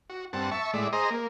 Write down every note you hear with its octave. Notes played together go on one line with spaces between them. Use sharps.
F#4
G2 C4 F#5 A5
E5 A5 C#6
A2 G#3 D5 E5
G#4 C5 D#5 A#5
A#3